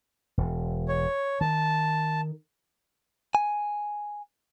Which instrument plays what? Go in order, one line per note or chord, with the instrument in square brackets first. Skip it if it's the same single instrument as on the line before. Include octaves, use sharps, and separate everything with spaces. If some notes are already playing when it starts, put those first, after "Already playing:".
[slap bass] E1
[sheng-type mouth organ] C#5
[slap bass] D#3 [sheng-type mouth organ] A5
[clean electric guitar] G#5